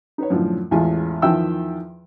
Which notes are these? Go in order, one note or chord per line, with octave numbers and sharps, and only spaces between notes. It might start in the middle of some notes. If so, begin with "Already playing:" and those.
D#4 B4 C#5
F#2 A2 D3 F3
A1 E2 G#3 F4 G#5
E2 D#3 F3 E5 G5 E6